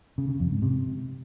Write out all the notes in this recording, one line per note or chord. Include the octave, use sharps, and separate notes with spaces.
C#3
C#3
F2
G#2
C3